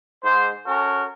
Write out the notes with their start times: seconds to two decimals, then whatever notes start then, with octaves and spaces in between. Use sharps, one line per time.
0.24 G#2 C5
0.67 C#4 F#4 A4 A#4